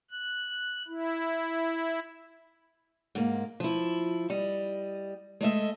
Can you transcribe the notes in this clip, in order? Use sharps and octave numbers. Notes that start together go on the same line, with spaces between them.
F#6
E4
G#2 A#3
F3 E4
G3 D#5
G#3 A3 D#5 E5